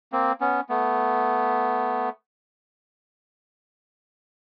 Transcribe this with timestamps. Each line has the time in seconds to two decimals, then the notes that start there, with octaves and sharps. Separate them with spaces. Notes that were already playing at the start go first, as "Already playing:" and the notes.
0.12 A#3 C4
0.40 B3 C#4
0.69 A3 B3